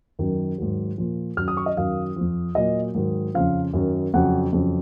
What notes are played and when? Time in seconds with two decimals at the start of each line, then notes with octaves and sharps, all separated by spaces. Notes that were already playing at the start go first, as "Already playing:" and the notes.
0.19 F#2 D#3 F#3
0.58 G#2 D#3 F#3
0.98 A#2 F3
1.37 F#2 D#3 F#3 F6
1.48 D#6
1.57 C#6
1.66 D#5
1.77 F#2 D#3 F#3 F5
2.16 F2 F3
2.55 A#2 F#3 D#5
2.95 G#2 D#3 F#3
3.34 F2 C#3 F3 F5
3.73 F#2 D#3 F#3
4.14 F2 C#3 F#3 F#5
4.53 F2 C#3 F#3